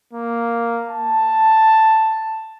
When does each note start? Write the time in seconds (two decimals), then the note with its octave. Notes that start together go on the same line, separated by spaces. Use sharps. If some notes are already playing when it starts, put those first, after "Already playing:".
0.13 A#3
0.88 A5